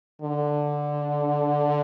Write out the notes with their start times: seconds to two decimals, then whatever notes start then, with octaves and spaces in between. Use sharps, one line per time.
0.22 D3